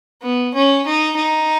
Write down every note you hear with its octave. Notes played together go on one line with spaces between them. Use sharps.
B3
C#4
D#4
D#4